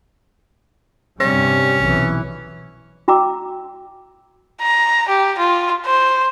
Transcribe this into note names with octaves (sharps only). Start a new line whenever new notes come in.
G2 C3 G3 C#4
B1 E3
F#4 G5 A#5 D6 E6
A#5
G4
F4
C5